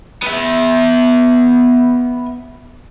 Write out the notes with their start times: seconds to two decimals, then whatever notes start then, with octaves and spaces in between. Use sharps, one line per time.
0.23 B3 E5